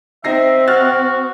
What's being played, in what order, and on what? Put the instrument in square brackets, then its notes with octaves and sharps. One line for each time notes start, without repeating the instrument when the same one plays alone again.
[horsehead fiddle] C4 [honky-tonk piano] D#4 A#6 C7 [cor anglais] E5
[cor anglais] F#4 [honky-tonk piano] F6 F#6 A6